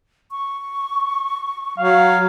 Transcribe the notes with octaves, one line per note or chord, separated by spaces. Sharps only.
C#6
F#3 F5